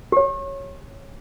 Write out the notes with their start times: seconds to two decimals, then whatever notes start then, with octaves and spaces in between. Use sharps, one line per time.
0.12 G4 C#5